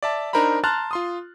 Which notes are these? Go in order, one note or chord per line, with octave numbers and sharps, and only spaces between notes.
D5 E5 A5
D4 D#4 A#4 C5 A#5 B5
A5 A#5 C6 F6 F#6 A6
F4 C6 D#6